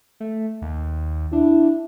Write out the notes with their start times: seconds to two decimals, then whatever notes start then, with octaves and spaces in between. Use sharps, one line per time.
0.20 A3
0.62 D#2
1.33 D4 E4